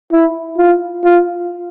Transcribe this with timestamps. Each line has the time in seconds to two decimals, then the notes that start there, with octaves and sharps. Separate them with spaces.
0.12 E4
0.58 F4
1.04 F4